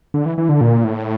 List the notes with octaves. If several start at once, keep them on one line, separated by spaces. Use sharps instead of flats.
D3
E3
E3
D3
A#2
A2